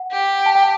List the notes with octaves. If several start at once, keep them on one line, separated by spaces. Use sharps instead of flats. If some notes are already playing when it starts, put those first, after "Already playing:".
Already playing: F#5
G4
A5
G5